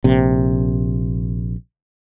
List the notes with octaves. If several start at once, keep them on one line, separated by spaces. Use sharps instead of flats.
A#1 C3